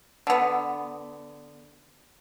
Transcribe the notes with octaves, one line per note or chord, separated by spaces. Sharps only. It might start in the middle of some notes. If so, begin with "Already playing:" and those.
D3 B3